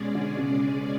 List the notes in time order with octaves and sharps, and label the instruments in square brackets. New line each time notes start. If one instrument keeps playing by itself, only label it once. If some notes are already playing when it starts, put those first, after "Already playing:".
Already playing: [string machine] B2 G#3 C#4 G#4 D5
[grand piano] D3
C#3